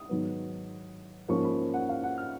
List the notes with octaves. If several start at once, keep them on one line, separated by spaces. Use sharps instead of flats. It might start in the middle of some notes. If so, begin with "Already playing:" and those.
Already playing: D#6
G#2 D#3 F#3 B3
G#2 F3 A#3 C#4 C#6
B5
F#5
F5
F#5
F6